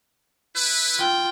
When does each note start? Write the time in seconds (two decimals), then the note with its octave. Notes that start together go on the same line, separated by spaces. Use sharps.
0.55 E4 B4
0.98 F4 G5